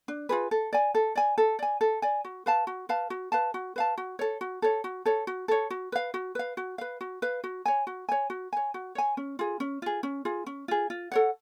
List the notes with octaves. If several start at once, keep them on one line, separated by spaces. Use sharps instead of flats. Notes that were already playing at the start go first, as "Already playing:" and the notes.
D4
F4 G#4 B4
A4
D5 G#5
A4
D5 G#5
A4
D5 G#5
A4
D5 G#5
F#4
B4 F5 A5
F#4
B4 F5 A5
F#4
B4 F5 A5
F#4
B4 F5 A5
F#4
A4 C#5
F#4
A4 C#5
F#4
A4 C#5
F#4
A4 C#5
F#4
B4 F5
F#4
B4 F5
F#4
B4 F5
F#4
B4 F5
F#4
C#5 G#5
F#4
C#5 G#5
F#4
C#5 G#5
F#4
C#5 G#5
C#4
F4 G#4
C#4
F4 G#4
C#4
F4 G#4
C#4
F4 G#4
F4
A4 C#5 F#5